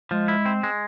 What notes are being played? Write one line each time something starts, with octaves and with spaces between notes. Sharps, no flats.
F3 G#3
E4
C4
G#3